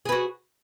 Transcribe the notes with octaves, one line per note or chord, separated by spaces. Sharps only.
F#4 G#4 B4